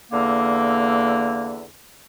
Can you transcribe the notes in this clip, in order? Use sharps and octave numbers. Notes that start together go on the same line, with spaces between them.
E2 D3 A#3